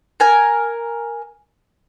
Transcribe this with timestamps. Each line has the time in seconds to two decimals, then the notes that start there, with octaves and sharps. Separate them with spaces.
0.20 A#4 G#5